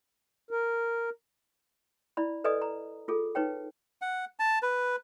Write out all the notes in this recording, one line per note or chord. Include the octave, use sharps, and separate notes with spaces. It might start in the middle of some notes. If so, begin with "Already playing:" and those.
A#4
E4 D5 B5
A4 B4 D5 D#5 G#5 D#6
A#5
F4 G#4 A4
D#4 B4 C#5 G5
F#5
A5
B4